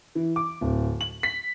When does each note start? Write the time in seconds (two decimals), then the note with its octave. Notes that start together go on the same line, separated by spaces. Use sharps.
0.15 E3
0.36 D6
0.61 D1
1.01 F#7
1.23 B6